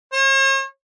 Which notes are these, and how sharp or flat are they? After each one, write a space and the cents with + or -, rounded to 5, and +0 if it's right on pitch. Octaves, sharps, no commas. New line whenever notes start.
C#5 -45